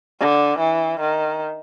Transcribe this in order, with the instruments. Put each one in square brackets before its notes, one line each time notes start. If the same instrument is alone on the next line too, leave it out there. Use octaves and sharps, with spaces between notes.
[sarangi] D3
E3
D#3